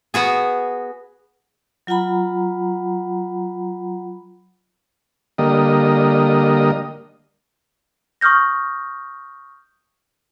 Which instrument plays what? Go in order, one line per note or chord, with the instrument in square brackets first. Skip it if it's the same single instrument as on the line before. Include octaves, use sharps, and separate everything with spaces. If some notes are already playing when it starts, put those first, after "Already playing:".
[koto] B3 F#4 G#4
[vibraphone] F#3 F4 F#5 A#5 B5
[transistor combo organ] D3 G3 A#3 D#5
[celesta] C#6 D#6 F6 G6 A#6